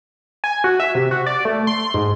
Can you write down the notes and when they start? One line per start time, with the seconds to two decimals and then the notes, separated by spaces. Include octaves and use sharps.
0.44 G#5
0.64 F#4
0.80 E5
0.95 C3
1.11 F#4
1.26 D5
1.45 A3
1.67 C6
1.94 G#2